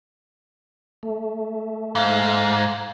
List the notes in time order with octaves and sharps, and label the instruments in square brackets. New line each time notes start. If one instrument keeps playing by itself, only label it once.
[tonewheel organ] A3
[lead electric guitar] G#2 [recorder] F5